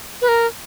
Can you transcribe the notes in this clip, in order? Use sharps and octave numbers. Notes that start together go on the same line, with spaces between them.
B4
A#4